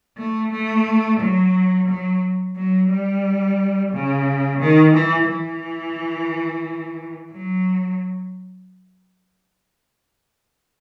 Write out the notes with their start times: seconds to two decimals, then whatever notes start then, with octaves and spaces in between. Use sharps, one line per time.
0.18 A3
0.52 A3
1.20 F#3
1.89 F#3
2.56 F#3
2.90 G3
3.92 C#3
4.60 D#3
4.94 E3
5.27 E3
7.31 F#3